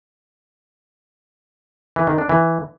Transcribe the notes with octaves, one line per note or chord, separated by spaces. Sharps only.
E3
D#3
D4
E3